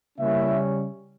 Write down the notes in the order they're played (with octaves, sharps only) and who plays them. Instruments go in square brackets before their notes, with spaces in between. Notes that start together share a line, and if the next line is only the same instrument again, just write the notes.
[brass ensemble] C#3 G3 A#3 C#4 E4 E5